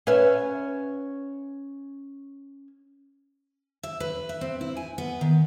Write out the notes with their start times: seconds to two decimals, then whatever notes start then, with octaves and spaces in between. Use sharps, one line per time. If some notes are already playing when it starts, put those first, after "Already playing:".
0.07 C#4 B4 E5
3.83 E5
4.00 B4
4.29 E5
4.41 C4
4.61 E4
4.77 G#5
4.98 B3
5.21 D#3